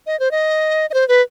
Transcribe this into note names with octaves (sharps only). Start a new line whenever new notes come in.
D#5
C5
D#5
D#5
C5
B4